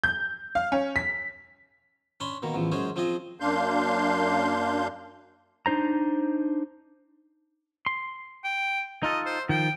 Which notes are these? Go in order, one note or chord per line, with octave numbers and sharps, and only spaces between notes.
G6
F5
C#4
B6
C#4 D4 B5 C6
B2 D#3 A#3
A1 E2 F3
F#2 G#3 C#4 G#4 C5
F3 C4 F4 G#4 D#5
F#2 A#3 D4 F5 C6 G6
D4 D#4 C5 A#5
C6
G5
D#4 F4 A4 D#5
C5
D#3 F3 G5